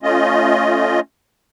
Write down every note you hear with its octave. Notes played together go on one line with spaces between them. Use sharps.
A3 C#4 F4 D#5